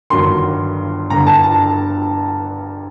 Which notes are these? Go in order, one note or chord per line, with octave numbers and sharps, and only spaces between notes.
G1 G2 D#3 F#3 C6
G1 G2 D3 A#5
A5
A5